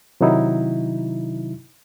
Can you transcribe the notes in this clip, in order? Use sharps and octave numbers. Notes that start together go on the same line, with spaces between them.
C3 D#3 F#3 D#4 E4